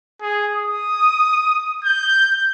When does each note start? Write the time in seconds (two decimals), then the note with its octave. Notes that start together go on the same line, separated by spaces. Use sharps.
0.21 G#4
0.54 D#6
1.85 G6